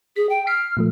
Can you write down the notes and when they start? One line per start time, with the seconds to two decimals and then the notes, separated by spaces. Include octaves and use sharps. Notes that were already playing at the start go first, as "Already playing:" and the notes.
0.16 G#4 B6
0.29 G5
0.47 F6 B6 C7 D7
0.77 A#2 F3 A3